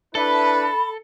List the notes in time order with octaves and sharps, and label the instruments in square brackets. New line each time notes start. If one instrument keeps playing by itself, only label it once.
[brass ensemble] D4 E4 B4 [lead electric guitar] A4 [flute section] B5